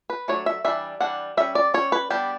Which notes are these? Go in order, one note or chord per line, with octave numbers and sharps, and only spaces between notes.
B4
F#3 A3 D4 C#5
E5
E3 G3 D4 E5
E3 G3 D4 F#5
G3 C#4 E5
D5
G3 C#4 C#5
B4
G3 B3 D4 G4